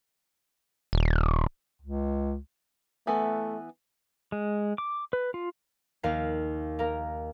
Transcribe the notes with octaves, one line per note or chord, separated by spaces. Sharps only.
D#1
C#2
E3 A3 B3
G#3
D6
B4
F4
D#2 A#4 F5
A#3 A#4